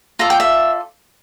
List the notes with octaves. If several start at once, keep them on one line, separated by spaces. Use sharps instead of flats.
F4 A4 D5 A#5
G5
E5